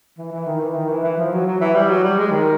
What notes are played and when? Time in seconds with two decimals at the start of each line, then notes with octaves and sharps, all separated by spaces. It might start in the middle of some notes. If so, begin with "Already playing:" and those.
0.18 E3
0.32 E3
0.46 D#3
0.60 E3
0.74 D#3
0.88 E3
1.03 E3
1.18 F3
1.32 F#3
1.46 F#3
1.60 E3
1.75 G3
1.89 F#3
2.03 G3
2.18 G#3
2.31 D#3